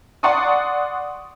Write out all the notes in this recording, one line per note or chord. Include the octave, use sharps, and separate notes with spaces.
D5 F#5 C6 C#6 D#6